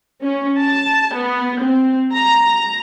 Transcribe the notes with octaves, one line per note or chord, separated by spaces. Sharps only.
C#4
A5
B3
C4
A#5